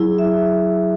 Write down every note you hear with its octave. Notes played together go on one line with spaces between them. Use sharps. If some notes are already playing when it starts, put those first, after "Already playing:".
Already playing: F#3 E4 G#4
E5